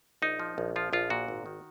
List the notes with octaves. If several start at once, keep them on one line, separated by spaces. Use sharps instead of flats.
A#1 D#4
F3
A#1
F3 F4
A#1 F4
A#2 F#4
G#1
D#3